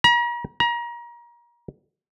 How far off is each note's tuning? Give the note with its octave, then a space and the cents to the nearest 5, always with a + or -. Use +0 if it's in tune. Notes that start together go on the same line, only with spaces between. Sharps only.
A#5 +40
A#5 +30